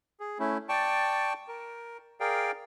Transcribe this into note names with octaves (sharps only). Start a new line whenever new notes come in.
G#4
A3 C#4 E4
D5 G5 A5 C#6
A#4
G#4 A#4 D5 F5 G5